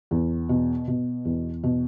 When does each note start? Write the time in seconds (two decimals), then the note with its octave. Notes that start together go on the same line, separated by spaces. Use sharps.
0.11 E2
0.49 B2
0.88 B2
1.25 E2
1.63 B2